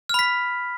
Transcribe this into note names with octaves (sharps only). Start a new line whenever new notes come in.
B5 F6 B6